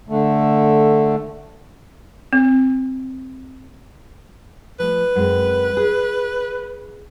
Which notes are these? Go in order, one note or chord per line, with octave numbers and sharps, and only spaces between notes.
D3 A3
C4
F3 A3 B4
F#2 G#3 C4
G#4